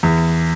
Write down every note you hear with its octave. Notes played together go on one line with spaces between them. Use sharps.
E2